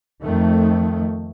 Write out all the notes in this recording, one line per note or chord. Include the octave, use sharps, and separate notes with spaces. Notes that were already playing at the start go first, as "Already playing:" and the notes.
F2 D#3 A3